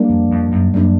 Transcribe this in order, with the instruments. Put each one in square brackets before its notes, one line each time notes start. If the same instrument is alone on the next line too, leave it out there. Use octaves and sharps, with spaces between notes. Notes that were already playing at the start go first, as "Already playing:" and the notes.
Already playing: [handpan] G3 A#3 D4
[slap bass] F2
F2
F#2
[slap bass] F#2 [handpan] G3 A#3 D4